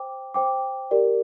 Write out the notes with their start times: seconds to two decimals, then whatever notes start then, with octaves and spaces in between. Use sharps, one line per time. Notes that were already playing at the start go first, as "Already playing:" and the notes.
Already playing: C5 G5 D6
0.34 C5 G5 D6
0.91 G4 A#4 D5